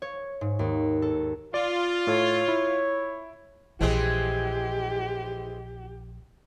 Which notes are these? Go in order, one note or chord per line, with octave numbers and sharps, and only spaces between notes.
C#5
G#2
D#2
A4
F4 D5
A2 A4 C#5 F5
E4
A#1 E3 G#3 C4 G4